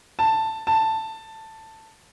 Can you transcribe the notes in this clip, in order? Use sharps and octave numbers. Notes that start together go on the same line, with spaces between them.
A5
A5